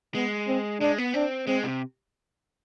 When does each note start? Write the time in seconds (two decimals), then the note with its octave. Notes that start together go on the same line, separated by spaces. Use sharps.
0.14 G#3 B3
0.48 C4
0.81 G#3 D4
0.98 B3
1.14 C4 D4
1.47 G#3 C4
1.64 C3